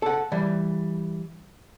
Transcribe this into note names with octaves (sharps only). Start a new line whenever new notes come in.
A4 F#5
E3 G3